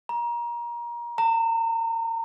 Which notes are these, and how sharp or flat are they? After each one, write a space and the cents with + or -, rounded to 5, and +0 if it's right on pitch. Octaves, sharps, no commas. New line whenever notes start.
A#5 +25
A#5 -35